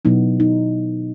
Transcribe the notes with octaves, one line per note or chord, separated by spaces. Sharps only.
B2 F#3 B3 D#4 E4
D#4